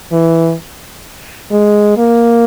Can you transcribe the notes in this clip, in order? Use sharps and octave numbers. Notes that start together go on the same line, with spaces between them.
E3
G#3
A#3